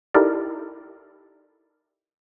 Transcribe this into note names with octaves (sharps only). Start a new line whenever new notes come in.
D#4 E4 G4 A4 A#4 D5